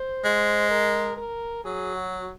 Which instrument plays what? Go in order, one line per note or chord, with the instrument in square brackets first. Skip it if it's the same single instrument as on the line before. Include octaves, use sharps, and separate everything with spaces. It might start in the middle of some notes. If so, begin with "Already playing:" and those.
Already playing: [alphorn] C5
[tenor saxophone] G#3
[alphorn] A#4
A#4
[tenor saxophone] F#3 [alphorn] G#4
[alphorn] F#4